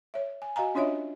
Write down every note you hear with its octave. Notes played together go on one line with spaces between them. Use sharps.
C#5 E5
G#5
F#4 D#5 F5 G#5 A#5
C#4 D4 F4 C#5 D#5 E5